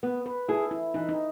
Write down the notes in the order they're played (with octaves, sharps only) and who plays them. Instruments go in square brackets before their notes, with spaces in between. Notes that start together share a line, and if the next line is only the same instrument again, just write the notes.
[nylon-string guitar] B3 [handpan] B4
[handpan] B4
[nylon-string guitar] E4 G#4 [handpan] A4
[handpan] E4
[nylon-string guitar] E3 [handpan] D#4
[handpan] D#4